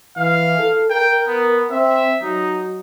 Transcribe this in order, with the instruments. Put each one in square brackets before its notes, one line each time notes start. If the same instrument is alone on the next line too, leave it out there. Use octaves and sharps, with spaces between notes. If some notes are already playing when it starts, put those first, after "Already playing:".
[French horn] E3 [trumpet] F5
[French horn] A4
[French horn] A#4 [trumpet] G5
[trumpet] B3
[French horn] C4 [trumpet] E5
[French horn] F#3 [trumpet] D#4